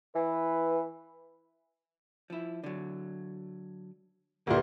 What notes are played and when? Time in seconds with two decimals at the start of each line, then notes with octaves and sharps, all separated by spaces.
0.15 E3 B4
2.30 F3 E4
2.64 D3 F#3
4.47 D2 A#2 A#3 G4 B4 D5